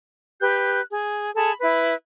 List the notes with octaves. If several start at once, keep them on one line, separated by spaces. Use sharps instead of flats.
G4 B4 F#6 G6
G#4
G#4 A4 A5 B5
E4 B4